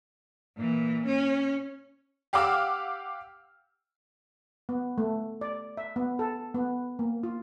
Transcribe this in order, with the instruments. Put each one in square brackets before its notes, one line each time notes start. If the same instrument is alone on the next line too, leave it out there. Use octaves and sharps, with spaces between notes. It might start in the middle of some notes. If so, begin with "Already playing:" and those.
[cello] A#2 E3
C#4
[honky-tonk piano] G4 F5 F#5 D6 E6 F6
[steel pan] B3
A3
D5
E5
B3
A4
B3
A#3
F4